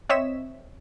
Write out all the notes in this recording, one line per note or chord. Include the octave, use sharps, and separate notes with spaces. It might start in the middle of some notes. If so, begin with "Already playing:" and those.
C4 C#5 D#5 E5 B6 E7